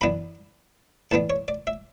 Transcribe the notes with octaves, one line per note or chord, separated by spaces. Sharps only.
F#2 E3 B3 D4 B5
A2 E3 B3 D4 A5
C#5
D5
E5